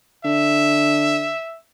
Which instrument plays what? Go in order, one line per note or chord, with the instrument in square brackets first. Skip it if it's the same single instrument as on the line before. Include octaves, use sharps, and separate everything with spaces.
[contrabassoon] D3 [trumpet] E5